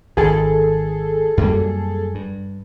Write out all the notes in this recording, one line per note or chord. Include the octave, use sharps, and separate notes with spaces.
G#1 G#2 G#4 A4
F#2 G3 A#3
G2